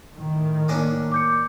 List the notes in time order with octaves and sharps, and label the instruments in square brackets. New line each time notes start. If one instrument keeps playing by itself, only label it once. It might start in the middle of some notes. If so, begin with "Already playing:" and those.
[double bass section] A2 D#3
[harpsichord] A#3 C#4 D4
[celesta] D6 G6 C#7